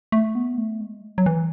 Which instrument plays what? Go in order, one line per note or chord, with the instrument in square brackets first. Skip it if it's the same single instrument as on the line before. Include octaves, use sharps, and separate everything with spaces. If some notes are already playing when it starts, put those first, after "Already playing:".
[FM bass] A3
B3
A3
G#3
F#3
E3